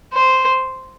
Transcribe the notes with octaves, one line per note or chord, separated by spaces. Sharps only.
C5